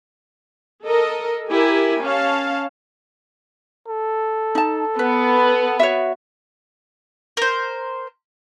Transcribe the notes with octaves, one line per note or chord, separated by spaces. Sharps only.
A4 A#4 D#5
E4 G4 A#4 G#5
C#4 F5 A5
A4
D#4 A5
B3 B4
F#4 C#5 E5
A#4 C5